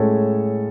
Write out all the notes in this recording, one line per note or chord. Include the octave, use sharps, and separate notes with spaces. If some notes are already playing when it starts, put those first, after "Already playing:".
Already playing: A2 G#3 C#4 A4